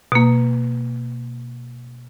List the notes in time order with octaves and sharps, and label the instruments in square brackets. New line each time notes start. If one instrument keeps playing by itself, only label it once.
[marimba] B2 A#3